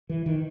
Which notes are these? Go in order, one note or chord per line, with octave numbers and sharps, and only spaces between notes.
E3
D#3